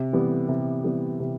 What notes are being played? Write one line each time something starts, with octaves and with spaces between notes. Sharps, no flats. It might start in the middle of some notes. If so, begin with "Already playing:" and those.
Already playing: C3
E3 G3 B3
C3
E3 G3 B3
C3